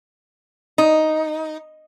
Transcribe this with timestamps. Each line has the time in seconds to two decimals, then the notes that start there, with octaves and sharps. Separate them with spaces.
0.78 D#4